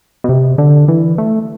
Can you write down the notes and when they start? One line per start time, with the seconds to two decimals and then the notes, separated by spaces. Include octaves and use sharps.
0.24 B2
0.29 C3
0.58 D3
0.88 E3
1.18 A3